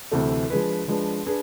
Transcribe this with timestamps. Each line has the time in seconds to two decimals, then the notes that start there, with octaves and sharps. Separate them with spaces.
0.12 D2 C3 E3 A3
0.50 F3 G#3 D4 G#4 B4
0.88 F3 G#3 D4 G#4 B4
1.27 D4 G#4 B4